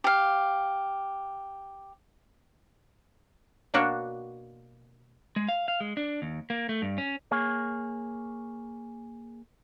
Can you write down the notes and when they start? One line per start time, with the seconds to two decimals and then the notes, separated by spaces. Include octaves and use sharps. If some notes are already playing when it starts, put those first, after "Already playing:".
0.04 G4 F5
3.74 B2 A#3 D4 F#4 C#5
5.36 G#3
5.48 F5
5.68 F5
5.80 G#3
5.97 D4
6.22 D#2
6.50 A#3
6.69 A3
6.82 G2
6.98 C#4
7.31 A#3 G#4 C#5